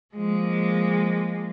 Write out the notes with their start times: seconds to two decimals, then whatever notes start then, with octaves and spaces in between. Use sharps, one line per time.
0.16 F3 G#3 A#3